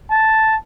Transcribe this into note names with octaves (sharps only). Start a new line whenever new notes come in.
A5